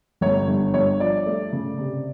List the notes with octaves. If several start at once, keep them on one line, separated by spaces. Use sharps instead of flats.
G1 C#5
G2
G2 C#5
F3 D5
A3
C#3
C3